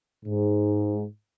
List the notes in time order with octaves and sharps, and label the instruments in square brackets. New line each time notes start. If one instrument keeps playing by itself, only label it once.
[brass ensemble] G#2